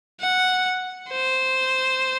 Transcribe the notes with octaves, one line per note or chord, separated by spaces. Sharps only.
F#5
C5